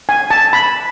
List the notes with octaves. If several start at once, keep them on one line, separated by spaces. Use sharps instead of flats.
G#5
A5
B5